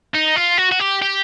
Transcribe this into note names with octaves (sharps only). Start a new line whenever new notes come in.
D#4
F4
F#4
F#4
G4
G4